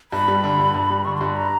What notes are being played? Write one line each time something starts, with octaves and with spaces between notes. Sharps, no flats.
G2 B5
G3
D3
G2
G2
G3
D3 C#6
C6
G2 B5
A#5